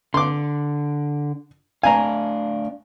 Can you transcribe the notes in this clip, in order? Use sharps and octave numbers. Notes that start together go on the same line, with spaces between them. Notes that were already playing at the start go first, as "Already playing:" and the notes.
D3 C6 D6
A3 D4 F5 G#5 A#5